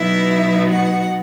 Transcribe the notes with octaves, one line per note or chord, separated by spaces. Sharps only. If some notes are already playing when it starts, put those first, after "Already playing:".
Already playing: B2 F#3 B3 D#4 E4 E5
F#4 F#5